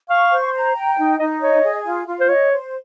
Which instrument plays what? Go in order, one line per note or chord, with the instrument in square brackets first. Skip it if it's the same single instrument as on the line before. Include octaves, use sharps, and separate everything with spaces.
[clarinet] F5 [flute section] C#6
[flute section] C5
A#5
G5
D#4
[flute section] D#4 [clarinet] D#5
[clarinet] C#5 [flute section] D#5
[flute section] G#4
F4
F4
[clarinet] C5
[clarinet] C#5 [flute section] D#5
[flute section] C5